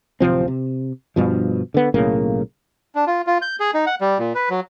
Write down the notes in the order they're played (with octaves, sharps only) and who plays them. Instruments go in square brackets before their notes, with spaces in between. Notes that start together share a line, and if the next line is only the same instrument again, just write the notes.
[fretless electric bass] D1 C3 F3 C4
C3
G2 B2 F3
D3 B3
B1 A2 C#3 A#3
[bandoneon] D4
F4
F4
G6
G#4
D#4
F#5
G3
A#2
B4
F#3